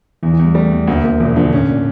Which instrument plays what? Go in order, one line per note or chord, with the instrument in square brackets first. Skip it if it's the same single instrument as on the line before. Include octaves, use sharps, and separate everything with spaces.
[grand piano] E2 [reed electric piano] E3
[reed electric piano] E3
[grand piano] E2 [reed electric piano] G3
[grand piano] G3 [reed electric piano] A3
[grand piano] E2
[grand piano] D2 [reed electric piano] A#3
[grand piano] D2 [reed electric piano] A#3
[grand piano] E1 [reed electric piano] F3
[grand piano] D3 [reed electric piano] F3
[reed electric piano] A2 [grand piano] C#4
[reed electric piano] A#2